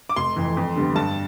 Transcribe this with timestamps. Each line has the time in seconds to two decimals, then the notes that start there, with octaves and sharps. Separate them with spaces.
0.09 D6
0.16 F1 C6
0.36 F2 E3
0.57 F2
0.76 D3 G3 B3
0.95 G2 A5